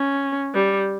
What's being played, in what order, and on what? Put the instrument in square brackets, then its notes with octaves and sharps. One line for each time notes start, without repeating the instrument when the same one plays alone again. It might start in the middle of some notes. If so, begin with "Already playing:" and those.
Already playing: [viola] C#4
G3